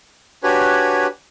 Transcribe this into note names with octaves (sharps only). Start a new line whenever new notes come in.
D4 F#4 G4 B4 C#5 G#5